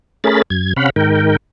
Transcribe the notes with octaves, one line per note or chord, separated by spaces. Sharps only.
A3 C#4 G#4 A#4 B5 A6
F#2 G#6
C3 C#4 F5 F#5 B5
G#2 D#3 A#4 G5